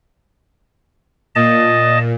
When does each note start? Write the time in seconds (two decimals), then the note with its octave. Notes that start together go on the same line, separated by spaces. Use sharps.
1.35 A#2 D#5 A5